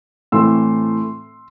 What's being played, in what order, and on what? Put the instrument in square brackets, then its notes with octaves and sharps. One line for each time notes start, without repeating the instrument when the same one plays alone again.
[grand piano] A2 E3 A3 C4 C6 E6